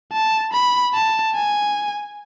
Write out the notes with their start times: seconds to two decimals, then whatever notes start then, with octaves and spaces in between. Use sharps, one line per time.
0.13 A5
0.53 B5
0.94 A5
1.35 G#5